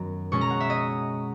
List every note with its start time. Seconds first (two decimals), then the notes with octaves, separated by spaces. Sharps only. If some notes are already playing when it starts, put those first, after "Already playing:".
Already playing: F#2 D#3 F#3 B3 A#5
0.32 B2 G#3 C#4 C#6
0.41 A#5
0.50 F#5
0.60 E5
0.70 D#5